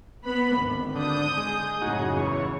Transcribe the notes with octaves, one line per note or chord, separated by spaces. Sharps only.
B3 B4 B5
G#1 D2
D3 D#6 G6
G#3
F#2 A2 C#3 D#4 F#4 G#4
E2 C#5